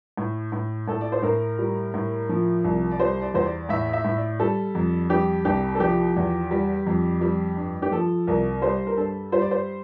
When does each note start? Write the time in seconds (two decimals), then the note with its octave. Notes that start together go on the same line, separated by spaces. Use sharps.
0.17 A2
0.52 A2
0.88 A2 A4
1.01 D5
1.12 C5
1.22 A2 A#4
1.59 G3
1.94 A2
2.29 F3
2.64 C2
2.91 D5
3.00 G3 C5
3.22 D5
3.34 E2 C5
3.46 D5
3.69 A2 E5
3.93 E5
4.05 A2
4.17 D5
4.39 G3 A4
4.75 F2
5.10 G3 G4
5.45 C2 G4
5.75 A4
5.80 F3 G4
6.16 E2
6.51 G3
6.86 F2
7.21 G3
7.56 G2
7.82 G4
7.91 F3 A4
8.27 C2 A#4
8.62 G3 C5
8.87 A#4
8.97 G2 A4
9.32 G3 C5
9.42 D5
9.51 C5